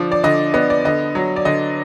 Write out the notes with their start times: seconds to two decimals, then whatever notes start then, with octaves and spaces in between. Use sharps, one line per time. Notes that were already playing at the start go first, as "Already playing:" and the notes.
Already playing: D3 F3 D5
0.12 D5
0.24 D3 D#5
0.54 B3 D#5
0.70 D5
0.85 D3 D#5
1.15 F#3
1.36 D5
1.45 D3 D#5